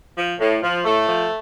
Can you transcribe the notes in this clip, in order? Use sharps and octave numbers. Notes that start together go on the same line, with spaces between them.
F3
A2
F3
A2 A3
F3